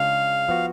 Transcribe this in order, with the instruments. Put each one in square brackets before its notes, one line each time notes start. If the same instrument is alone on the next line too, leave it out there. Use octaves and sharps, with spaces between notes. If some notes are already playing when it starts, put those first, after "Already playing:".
Already playing: [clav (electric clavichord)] C#3 G#3 D4 F4 G#4 [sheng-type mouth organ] F5
[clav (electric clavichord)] F3 B3 F#4